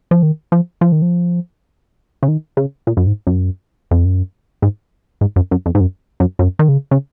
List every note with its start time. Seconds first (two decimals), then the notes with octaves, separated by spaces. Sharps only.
0.11 F3
0.23 D#3
0.52 F3
0.81 F3
0.92 D#3
1.02 F3
2.23 C#3
2.28 D#3
2.57 C#3
2.87 A#2
2.97 F#2
3.07 G#2
3.27 F#2
3.91 F2
4.05 F#2
4.62 G#2
5.21 G#2
5.36 F#2
5.51 F#2
5.66 F2
5.75 G#2
5.80 F#2
6.20 F#2
6.39 F#2
6.59 D#3
6.69 C#3
6.91 C#3